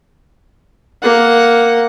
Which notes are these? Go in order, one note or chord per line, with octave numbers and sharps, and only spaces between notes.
A#3 F#5